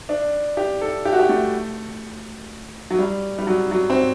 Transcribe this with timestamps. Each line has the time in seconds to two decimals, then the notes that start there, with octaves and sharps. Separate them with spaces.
0.09 D4
0.57 G4
0.81 A4
1.05 G4
1.13 F#4
1.19 G4
1.29 A3
2.90 F#3
2.99 G3
3.38 G3
3.47 F#3
3.71 F#3
3.90 C4